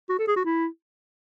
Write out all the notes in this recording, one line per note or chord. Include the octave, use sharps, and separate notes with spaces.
F#4
A4
G#4
F#4
E4